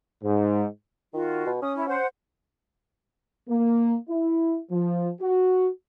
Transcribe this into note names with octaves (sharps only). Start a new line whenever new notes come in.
G#2
D#3 F4 F#4
B2
C#4 D#6
E4 C#5
C5 F#5
A#3
E4
F3
F#4